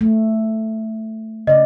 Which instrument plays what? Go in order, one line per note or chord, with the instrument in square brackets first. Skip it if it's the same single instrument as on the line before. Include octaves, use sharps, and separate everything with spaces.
[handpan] A3
[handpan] C#3 D5 [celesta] D#5